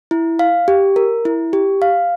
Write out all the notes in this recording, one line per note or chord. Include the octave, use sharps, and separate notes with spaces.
E4
F5
G4
A#4
E4
G4
F5